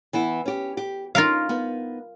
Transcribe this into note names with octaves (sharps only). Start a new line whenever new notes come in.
E3 B3 E4
C#4 G4
G4
C#4 D#4 F4 A#4 F5
B3 D#4